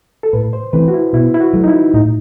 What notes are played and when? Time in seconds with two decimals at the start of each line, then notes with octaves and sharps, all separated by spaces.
0.23 A4
0.33 A2 B4
0.53 C5
0.73 E3 A3 C4 B4
0.88 F#4
0.94 E4
1.13 B2 E4
1.34 E4
1.41 F#4
1.53 F#3 A3
1.64 D#4
1.68 E4
1.94 A2 D#4